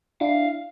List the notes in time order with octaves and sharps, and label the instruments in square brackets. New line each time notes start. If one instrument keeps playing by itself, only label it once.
[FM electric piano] D4 E4 [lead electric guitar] F5